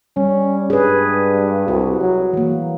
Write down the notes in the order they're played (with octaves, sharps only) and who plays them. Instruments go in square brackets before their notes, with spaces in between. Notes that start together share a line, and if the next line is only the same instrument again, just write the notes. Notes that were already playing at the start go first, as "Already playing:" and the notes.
[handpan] G3 [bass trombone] C#4
[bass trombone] G2 [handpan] G#4 B4
[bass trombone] C2 [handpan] F#4
[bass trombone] F#3
[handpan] E3 A#3